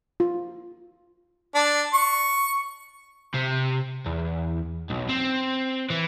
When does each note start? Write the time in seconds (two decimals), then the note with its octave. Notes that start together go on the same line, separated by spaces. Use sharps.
0.20 F4
1.55 D4
1.94 C#6
3.34 C3
4.06 E2
4.90 B1
5.09 C4
5.90 E3